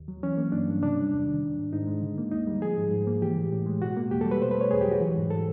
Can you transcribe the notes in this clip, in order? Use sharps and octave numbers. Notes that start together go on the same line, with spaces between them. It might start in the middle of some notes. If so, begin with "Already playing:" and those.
Already playing: D#2
F#3
E3 C#4
A#3
G2 D4
G3
C3 D4
G3
E2
D#3
D#3
G#2
G#2 D#4
G#3
D3
A#3
D#2 D#4
G3
F3 G#4
G#2
G#2
A#3
E3 G4
A2
A2
G#3
B2 F#4
A#3
E2 G4
G3 A4
B4
B2 C5
B4
A3 C#5
E2 G#4
G4
F#3
F#4
E3
G#2
A4